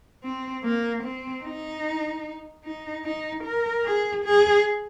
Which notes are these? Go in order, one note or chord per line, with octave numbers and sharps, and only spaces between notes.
C4
A#3
C4
D#4
D#4
D#4
A#4
G#4
G#4